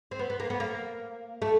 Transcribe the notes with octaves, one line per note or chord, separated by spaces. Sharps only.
C4
B3
B3
A#3
B3
A#3
A3